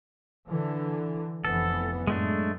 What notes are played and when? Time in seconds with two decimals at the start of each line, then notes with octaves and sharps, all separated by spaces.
0.47 D3 E3
1.45 F1 E3 B3 A4
2.07 F#2 A2 G#3 A3 D4